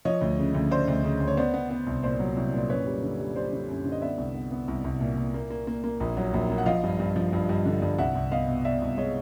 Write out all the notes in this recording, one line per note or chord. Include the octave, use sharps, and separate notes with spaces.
F3 C#5 D#5
D2
C#3
D2
D2 C5 D5
D2
C#3
D2
C#5
B3 C5 D5
B3
B3
C2
A#2 C5 D5
F#3
C2
A#2
D5
F#2 B4 C#5
G3
D3
G3
G3 C5 D5
D3
F#2
D3
D#5
B3 D5 E5
C2
B3
B3
C2
C2
A#2
A#2
A#3
A#3
A#3
A#3
A#1
F#3
A#1
A#3
F#5
F3 D#5 F5
G2
G2
F3
G2
G2
D3
G2
C2 E5 F#5
C2
B3 D#5 F5
B2
B2 D5 E5
C2
G#3 C#5 D#5